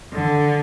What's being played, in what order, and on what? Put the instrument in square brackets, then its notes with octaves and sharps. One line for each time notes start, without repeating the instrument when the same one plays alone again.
[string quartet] D3